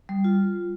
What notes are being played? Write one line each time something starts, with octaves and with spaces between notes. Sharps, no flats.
G3
F4